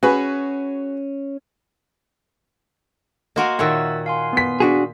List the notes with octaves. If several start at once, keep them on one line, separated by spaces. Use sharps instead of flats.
C#4 F#4 G#4 B4
A#3 F#4 A#4 D#5 C6 C#6
A#2 D#3 C#5 E5 F#5 E6 A6
F5 G#5 C6
B3 B6
D4 F#4 G#4